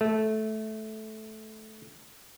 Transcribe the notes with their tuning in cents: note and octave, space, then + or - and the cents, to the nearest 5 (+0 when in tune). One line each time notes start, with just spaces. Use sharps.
A3 -15